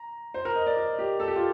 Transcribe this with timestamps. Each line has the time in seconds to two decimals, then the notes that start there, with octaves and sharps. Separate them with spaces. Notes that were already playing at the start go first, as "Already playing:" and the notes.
Already playing: A#5
0.34 C5
0.45 A#4
0.56 D#5
0.66 D5
0.77 A#4
0.99 G4
1.20 A4
1.28 G4
1.36 F4